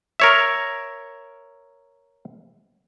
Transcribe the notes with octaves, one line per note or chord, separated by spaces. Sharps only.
A#4 C#5 E5